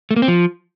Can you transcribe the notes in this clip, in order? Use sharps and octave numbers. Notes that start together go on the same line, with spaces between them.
A3
A#3
C4
F3